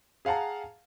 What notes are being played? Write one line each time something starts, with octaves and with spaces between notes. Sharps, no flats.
G#4 F5 F#5 A5 A#5